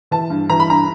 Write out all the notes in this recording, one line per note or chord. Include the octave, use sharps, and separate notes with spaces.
E3 A5
G2
E3 A#5
B5
G2 A#5